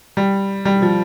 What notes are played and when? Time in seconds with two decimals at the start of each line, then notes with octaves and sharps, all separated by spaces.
0.17 G3
0.65 G3
0.82 F3